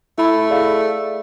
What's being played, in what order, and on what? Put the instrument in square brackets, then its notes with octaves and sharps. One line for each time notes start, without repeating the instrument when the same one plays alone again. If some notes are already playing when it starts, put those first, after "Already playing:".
[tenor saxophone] A3 [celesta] E4 B5
[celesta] G#4 D5 F5